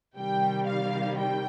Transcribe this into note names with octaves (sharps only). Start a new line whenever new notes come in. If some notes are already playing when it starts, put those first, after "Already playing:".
C3 D#3 G3 G5
F5
G5